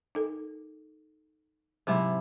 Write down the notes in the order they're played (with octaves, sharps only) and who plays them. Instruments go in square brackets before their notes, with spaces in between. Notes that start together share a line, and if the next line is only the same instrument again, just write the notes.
[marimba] D#4 A4 A#4
[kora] G#2 C3 E4 [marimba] F#3